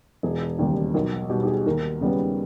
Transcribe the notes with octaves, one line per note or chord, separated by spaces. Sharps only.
E1 G#4
D#2 C#3 G3
B1 A#4
B2 G3 G4
G4
G#4
D#2 A#4
C#3 G3 B3